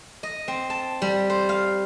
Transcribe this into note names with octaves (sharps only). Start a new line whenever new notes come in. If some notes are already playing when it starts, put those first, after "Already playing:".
D#5
C4
A5
G3
C5
F5